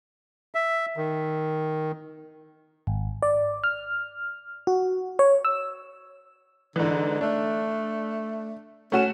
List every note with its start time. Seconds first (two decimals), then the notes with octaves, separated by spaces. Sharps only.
0.55 E5
0.97 D#3
2.87 G#1
3.22 D5
3.64 F6
4.67 F#4
5.19 C#5
5.45 E6
6.76 G#2 D3 E3
7.21 A3 D4
8.92 A3 C#4 F#4 E7